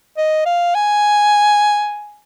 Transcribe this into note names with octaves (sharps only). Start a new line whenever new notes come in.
D#5
F5
G#5